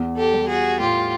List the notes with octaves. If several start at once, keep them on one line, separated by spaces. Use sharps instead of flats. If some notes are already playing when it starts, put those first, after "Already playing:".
Already playing: E2
G4 A4
G3
F#4 G#4
A2 F4 G4